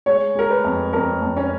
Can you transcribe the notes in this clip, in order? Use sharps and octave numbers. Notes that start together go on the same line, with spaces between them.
G#3 C#5
G#3 A#4
B4
F2
F2 A#4
F2
C#4